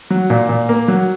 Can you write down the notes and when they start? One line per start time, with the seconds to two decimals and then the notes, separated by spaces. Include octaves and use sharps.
0.10 F#3
0.30 A#2
0.49 A#2
0.69 A#3
0.88 F#3